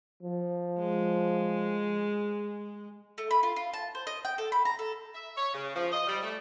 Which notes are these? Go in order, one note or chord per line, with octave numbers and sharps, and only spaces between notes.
F3
G#3
A3
B5
F4
F4
A5
C5
D#5
G5
A4
B5
A#5
A4
E5
C#5
C#3
F3
D#5
G3
A3